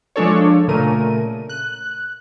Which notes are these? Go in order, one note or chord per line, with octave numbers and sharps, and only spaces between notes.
F3 G#3 D4 A4 C#5
A#2 C#3 A3 A#4 D#7
F#6